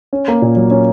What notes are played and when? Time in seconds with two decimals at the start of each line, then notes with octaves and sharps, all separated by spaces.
0.13 C#4
0.28 A#3
0.42 A#2
0.56 F#3
0.71 C#4